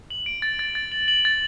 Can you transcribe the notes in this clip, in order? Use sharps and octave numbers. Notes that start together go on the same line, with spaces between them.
F#7
D7
A6
A6
A6
F#7
F#7
A6